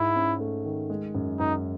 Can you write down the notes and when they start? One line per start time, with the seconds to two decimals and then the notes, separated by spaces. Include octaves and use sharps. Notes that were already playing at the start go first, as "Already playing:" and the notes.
Already playing: G#2 E4
0.16 C#4
0.40 A3
0.65 D#3
0.90 G#3
1.15 F#2
1.39 F#2 D#4